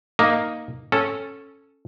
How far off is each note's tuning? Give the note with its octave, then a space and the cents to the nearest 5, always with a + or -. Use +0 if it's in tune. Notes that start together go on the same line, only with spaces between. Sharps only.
A#3 +0 D#4 +0
C#4 -10 A4 +0